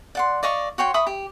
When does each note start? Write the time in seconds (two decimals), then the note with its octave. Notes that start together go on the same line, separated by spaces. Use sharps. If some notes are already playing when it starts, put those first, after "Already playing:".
0.15 D5 F#5 C6
0.43 D5 D#5 F5 C#6
0.78 F#4 C#5 G5 C6
0.94 E5 B5 C#6 D#6
1.07 G4